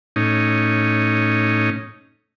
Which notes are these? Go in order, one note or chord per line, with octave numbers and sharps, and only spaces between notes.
A2 C#4 D#4